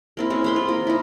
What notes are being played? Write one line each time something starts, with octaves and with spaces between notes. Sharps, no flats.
A#3 C4 E4
G#3 C4 C#4
C5 B5 C6
F4
A#3
D#4 E4